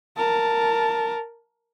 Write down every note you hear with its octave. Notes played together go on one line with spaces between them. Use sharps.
A#4 A5